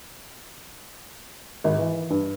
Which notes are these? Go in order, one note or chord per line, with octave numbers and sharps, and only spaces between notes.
G#1
E3
G2